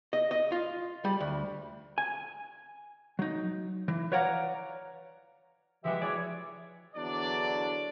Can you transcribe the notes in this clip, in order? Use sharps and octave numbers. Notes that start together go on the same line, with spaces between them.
D#5
D#5
F4
G3
D2
G#5
F#3 D#4
E3
B4 C#5 D5 F5 F#5 A#5
E3 F3 G#3 F#4 G4 E5
E4 G#4 C#5 D5
E2 D3 F#3 D4 D5